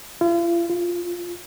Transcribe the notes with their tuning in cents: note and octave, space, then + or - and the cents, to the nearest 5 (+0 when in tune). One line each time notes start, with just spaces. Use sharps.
F4 -45
F4 +0